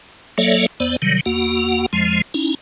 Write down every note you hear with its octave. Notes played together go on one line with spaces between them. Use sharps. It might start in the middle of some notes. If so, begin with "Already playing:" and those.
F#3 A#3 A4 C#5 D5 E5
E2 B3 C5 D5
C3 D#3 F#3 G3
E2 A#3 F#4 F#5
F2 F3 G#3
C#4 D#4 E4